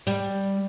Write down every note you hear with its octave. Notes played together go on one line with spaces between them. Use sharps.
G3